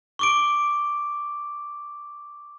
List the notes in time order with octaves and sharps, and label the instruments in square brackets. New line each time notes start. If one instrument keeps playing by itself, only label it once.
[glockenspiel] C#6 D6 D7